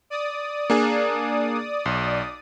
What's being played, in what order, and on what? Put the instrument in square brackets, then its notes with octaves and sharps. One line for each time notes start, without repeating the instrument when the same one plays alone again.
[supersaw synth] D5 D#6
[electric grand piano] A#3 D4 G#4
B1